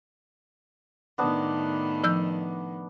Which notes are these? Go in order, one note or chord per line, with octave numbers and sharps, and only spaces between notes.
A2 D#3 B3 D4 F#5
F3 E6 G6